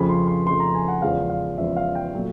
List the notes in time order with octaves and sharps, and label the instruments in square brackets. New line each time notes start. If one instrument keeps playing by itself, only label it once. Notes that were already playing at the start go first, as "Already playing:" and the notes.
Already playing: [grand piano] F2 C#3 F3 A3 B5
C6
C6
F2 C#3 F3 A3 C6
A#5
G#5
F#5
E2 C#3 F3 G#3 F5
F5
E2 C#3 F3 G#3 E5
F5
G5
A#2 F#3 A3